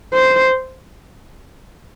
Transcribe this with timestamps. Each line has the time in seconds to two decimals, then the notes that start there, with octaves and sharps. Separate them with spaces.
0.14 C5